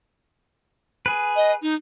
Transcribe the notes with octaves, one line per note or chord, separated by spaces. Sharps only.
G#4 B4
D#5
D#4